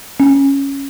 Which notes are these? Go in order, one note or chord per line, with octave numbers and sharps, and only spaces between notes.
C#4